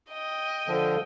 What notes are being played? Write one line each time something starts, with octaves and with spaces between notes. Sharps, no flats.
D#5 G5
D3 F3